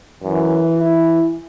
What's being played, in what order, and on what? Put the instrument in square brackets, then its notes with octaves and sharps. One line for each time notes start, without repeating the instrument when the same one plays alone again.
[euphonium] F#2 [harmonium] E3
[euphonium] E4